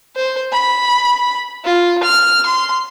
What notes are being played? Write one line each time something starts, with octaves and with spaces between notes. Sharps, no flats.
C5
B5
F4
F6
C6